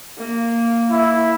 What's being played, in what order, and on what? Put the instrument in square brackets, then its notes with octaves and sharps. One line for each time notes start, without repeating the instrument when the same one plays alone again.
[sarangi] A#3
[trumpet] E4